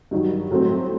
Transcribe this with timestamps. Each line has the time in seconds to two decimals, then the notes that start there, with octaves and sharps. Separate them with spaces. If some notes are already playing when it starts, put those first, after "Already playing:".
0.11 G2 D#3 F#3
0.51 A2 F#3 A3 C4